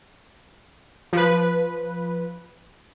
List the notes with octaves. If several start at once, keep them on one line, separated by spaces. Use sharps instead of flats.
F3 B4